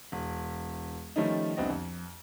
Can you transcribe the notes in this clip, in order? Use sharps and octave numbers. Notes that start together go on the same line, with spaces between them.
E1
D#3 F3 G3 A3 C#4 D#4
C2 B3 C4 D4 D#5
F2